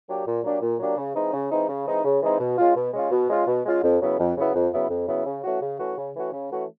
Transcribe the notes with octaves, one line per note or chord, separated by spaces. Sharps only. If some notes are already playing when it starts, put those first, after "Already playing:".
F#3 A#3 D4 G4
A#2
F#3 A#3 D4 G4
A#2
F#3 A#3 D4 G4
C#3
E3 G#3 C4 D#4
C#3
E3 G#3 C4 D#4
C#3
E3 G#3 C4 D#4
C#3
E3 G#3 C4 D#4
B2
G#3 C#4 F4
B2
G#3 C#4 F4
B2
G#3 C#4 F4
B2
G#3 C#4 F4
F2
C#3 F#3 B3 E4
F2
C#3 F#3 B3 E4
F2
C#3 F#3 B3 E4
F2
C#3 F#3 B3 E4
C#3
E3 A3 C#4 F#4
C#3
E3 A3 C#4 F#4
C#3
E3 A3 C#4 F#4
C#3
E3 A3 C#4 F#4